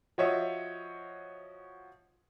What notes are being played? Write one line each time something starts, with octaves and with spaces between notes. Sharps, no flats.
F3 F#4 C#5 D#5 E5